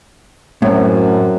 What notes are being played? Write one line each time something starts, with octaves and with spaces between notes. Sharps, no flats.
F#2 A2 F#3 C4